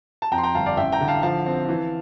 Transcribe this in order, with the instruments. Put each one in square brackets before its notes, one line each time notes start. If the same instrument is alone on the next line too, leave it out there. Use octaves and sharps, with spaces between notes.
[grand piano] A5
F2 G5 A#5
C6
G5 A#5
G1 F5 A5
D5 F5
A1 E5 G5
G5 A#5
D3
F5 A5
F3 F5 A5
C4
E3